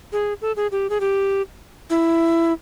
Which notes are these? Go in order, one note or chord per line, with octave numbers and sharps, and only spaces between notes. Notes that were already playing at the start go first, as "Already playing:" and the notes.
G#4
A4
G#4
G4
G#4
G4
E4